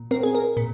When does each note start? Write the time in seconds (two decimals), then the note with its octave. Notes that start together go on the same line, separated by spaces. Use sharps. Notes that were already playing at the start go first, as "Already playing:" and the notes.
Already playing: A#2
0.11 C4 A#4
0.23 G#4
0.35 A#4
0.57 A#2